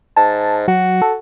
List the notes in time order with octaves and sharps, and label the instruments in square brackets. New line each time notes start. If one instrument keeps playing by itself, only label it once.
[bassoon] G#2 [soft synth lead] A5
[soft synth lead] F#3 [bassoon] F#4
[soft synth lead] A4